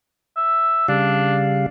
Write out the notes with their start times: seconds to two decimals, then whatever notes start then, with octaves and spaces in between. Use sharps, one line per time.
0.36 E5
0.88 C#3 G3 D4 F5